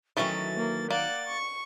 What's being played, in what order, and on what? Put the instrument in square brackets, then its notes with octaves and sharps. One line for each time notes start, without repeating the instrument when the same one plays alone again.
[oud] D#3 F#3 [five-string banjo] E3 A3 C#4 [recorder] A6
[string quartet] A#3
[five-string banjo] A#3 [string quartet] D5 F#5 F#6 [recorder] A6
[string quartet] C#6